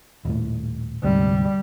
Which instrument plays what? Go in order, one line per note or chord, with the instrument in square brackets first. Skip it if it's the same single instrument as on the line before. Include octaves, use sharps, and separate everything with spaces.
[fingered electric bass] D#1 A2
[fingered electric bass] D2 G#2 C3 [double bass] G3